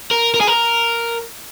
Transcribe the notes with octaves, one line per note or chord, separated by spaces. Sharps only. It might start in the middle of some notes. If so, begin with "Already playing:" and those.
A#4
A#4
G#4
A#4